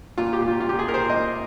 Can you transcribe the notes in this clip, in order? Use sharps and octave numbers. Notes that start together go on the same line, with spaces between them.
A#2 F4
G4
A#2
F4
A#2 F4
G4
G#4
A#2 A#4
C5
A#2 D#5